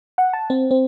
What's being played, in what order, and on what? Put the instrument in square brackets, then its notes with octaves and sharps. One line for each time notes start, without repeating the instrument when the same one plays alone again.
[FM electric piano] F#5
A5
C4
C4